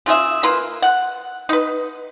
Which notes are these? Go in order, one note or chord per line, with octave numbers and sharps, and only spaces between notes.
C#3 F4 G#4 E5
A#3 F4 B4
F#5
D#4 B4